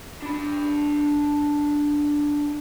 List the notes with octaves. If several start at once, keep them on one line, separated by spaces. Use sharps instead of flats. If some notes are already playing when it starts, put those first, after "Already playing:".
D4 B5